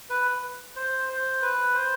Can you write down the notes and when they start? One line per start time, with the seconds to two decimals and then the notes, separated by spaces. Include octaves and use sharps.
0.10 B4
0.76 C5
1.09 C5
1.42 B4
1.75 C5